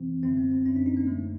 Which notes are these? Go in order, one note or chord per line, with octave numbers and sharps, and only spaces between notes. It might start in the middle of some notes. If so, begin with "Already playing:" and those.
Already playing: F2 C3 E3 C4
F#2 D3 C4
B3
C4
F#2 D3 C#4
D4
D#4
A#3
F#2 D3 A3